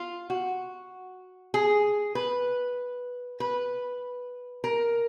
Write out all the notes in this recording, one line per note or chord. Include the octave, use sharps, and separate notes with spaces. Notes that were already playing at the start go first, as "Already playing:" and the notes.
Already playing: F4
F#4
G#4
B4
B4
A#4